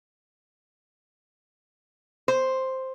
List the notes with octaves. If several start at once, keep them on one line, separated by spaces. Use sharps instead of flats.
C5